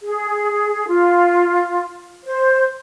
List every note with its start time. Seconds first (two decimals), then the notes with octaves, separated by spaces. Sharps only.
0.01 G#4
0.87 F4
2.24 C5